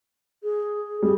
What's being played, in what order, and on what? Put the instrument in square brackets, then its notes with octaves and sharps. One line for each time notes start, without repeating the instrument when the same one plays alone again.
[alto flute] G#4
[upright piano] G3 [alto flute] G#4